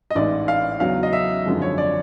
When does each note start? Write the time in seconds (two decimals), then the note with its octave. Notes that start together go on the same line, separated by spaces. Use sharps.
0.11 D#5
0.15 A1 G#2 E3 D5
0.48 F5
0.80 E2 C#3 F#3 F5
1.03 D#5
1.13 E5
1.45 G#1 F#2 D3 F3 G#3
1.62 C#5
1.78 D5